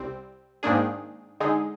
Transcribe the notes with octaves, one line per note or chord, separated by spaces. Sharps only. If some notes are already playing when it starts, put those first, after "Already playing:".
Already playing: C2 C3 G3 C4
G#2 D#3 A#3 D4 G#4
D3 G#3 D#4 G#4